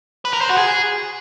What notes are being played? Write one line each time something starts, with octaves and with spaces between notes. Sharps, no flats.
B4
A#4
C5
F#4
G#4